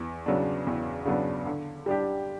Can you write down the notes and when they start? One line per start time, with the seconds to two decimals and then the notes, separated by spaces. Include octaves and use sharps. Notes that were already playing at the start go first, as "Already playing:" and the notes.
Already playing: E2
0.26 C#3 F#3 B3 D4
0.67 E2
1.05 C#3 F#3 B3 D4
1.46 D3
1.86 G3 D4 G4